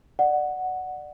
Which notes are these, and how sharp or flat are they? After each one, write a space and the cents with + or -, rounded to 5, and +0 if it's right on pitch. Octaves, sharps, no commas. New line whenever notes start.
D5 +20 F#5 +0